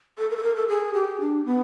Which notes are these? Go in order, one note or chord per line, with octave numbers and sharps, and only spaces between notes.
A4
A#4
A4
A#4
A4
G#4
G4
D4
B3